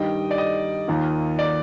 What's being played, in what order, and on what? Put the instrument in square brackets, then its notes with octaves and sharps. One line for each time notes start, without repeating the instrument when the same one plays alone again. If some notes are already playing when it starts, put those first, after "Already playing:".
Already playing: [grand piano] G2 D#3 G3 [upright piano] D#5 G5
[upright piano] D5
D#5
[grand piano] D#2 D#3 A#3 F4
[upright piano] D5